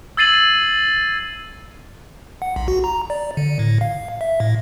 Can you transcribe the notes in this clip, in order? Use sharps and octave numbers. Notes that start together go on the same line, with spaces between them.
E6 G#6 A6 C7 D#7 F#7
F#5
B1
F#4
A#5
D5
D3
A2
F5
E5
A2